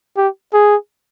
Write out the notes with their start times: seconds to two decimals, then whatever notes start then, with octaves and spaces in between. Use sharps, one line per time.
0.17 G4
0.54 G#4